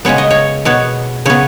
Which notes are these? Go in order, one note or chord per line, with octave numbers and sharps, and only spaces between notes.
C#3 G#3 B3 C#5
D#5
C#5
B2 B3 C#5
C#3 B3 C#5